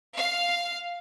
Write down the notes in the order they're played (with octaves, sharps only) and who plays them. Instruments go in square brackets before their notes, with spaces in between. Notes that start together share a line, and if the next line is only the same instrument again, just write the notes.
[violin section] F5